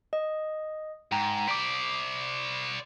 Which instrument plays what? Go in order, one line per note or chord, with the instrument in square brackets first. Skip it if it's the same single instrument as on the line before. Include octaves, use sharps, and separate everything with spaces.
[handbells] D#5
[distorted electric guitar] G#2 [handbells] G5 A#5
[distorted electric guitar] C5 D5 [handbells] D6 B6